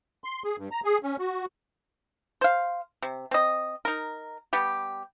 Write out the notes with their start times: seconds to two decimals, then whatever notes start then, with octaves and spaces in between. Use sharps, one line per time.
0.24 C6
0.44 G#4
0.58 G2
0.72 A#5
0.84 G#4
1.03 C#4
1.19 F#4
2.41 C5 F5
3.02 C3
3.31 C4 D#5
3.85 D#4 A#4
4.53 G3 B3 G4